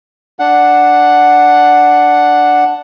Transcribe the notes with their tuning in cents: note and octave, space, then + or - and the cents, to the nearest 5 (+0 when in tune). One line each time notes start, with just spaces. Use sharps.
D4 +0 F#5 +0